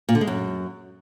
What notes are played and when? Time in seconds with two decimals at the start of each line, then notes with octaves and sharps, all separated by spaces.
0.09 A#2
0.15 D3
0.21 G#3
0.27 F#2